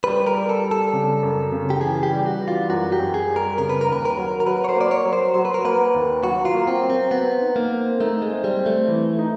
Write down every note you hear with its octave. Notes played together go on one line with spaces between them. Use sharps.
G3 B4
A#4
G3
A4
G3
A4
C#3
F#2
C#3
G4
E3 G#4
G4
G3
F#4
E3
F4
F#2 F#4
G4
F#2
G#4
G3
A#4
C#3 A#4
B4
A#4
D#2 B4
A#4
F#3
A#4
F#3 B4
C#5
C5
A#3 D5
C#5
F#3
C5
F#3 C5
B4
A#4
A#3 B4
D#2
F#3 F#4
F4
A#3
C4
F#3
C4
B3 C4
D#4
A#3
C4
A3 D#4
G#3
C4
G3
C4
A3
E3
D#4